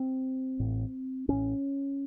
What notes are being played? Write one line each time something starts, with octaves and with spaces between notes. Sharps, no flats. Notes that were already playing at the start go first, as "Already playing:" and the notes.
Already playing: C4
A1 A2
A1 A2 C#4